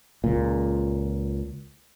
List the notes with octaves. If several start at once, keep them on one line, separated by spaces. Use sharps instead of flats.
C#2 A#2